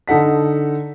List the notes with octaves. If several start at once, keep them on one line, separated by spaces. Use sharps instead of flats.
D3 D#4 A4 F#5 B6